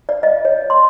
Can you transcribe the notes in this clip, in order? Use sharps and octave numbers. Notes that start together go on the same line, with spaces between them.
D5
D#5
C#5
C6